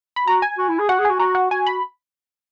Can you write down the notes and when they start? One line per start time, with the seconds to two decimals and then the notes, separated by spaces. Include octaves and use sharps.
0.16 B5
0.27 F#4 A#5
0.42 G#5
0.58 F#4
0.69 E4
0.79 G#4
0.89 F#4 F#5
0.99 G#4
1.05 F#4 G#5
1.20 F#4 A#5
1.35 F#5
1.51 F#4 G#5
1.67 B5